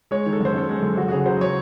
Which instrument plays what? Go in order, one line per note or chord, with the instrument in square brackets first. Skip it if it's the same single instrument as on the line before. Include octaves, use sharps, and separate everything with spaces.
[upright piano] G#3 C#5
D#3
A4
F#2 C5
F#2 A4
G#3
F#2
F#2 F#4
F#4
C#3 G#4
F#3 C5
F#3 C#5